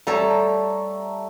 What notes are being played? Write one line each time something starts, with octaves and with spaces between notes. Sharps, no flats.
G3 A3 A4 C#5 A#5